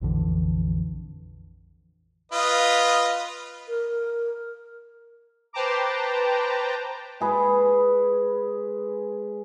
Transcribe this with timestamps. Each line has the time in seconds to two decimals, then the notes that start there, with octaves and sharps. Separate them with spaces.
0.01 A#1 F2 D3 E3
2.32 F4 B4 D#5
3.68 A#4
5.53 B4 C5 G5 A5 A#5 D6
7.21 G#3 G#4 B4